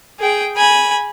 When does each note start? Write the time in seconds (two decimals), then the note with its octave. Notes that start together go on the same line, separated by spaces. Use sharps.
0.20 G#4 G5
0.57 G#5 B5